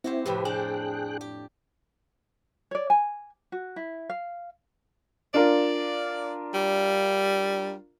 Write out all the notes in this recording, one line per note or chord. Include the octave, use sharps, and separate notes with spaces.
C4 E4 F#4 G4 C5
F2 A2 C3 G4 B4
D4 G#4 G5 F#6
G4
C#5 D5
G#5
F#4
E4
F5
D4 F4 A#4 D5
G3